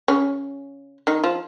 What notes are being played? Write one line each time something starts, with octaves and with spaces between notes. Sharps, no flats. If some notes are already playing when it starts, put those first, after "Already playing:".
C#3 C#4
D#3 D#4
F3 F4